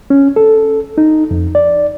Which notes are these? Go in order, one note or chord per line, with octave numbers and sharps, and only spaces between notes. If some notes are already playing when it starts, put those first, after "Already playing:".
C#4
A4
D#4
F2
D5